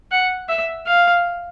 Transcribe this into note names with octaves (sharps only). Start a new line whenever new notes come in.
F#5
E5
F5